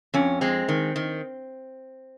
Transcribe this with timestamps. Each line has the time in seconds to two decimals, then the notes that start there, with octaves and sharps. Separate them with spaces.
0.14 F2 C#4
0.41 G#3 C4
0.68 D#3
0.96 D#3